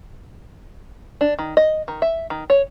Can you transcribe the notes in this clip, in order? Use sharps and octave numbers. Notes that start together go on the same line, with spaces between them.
D4
D#3
D#5
D#3
E5
D#3
C#5